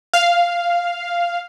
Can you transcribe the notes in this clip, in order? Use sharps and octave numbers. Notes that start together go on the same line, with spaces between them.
F5